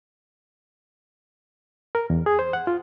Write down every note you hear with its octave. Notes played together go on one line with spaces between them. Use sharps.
A#4
E2
G#4
C5
F#5
F4